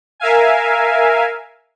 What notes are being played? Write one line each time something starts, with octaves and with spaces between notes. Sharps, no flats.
A#4 E5 F5 G#5